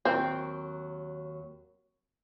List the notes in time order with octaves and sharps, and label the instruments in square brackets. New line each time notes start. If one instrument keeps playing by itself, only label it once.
[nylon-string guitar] D#2 F#3 A#4 [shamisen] C4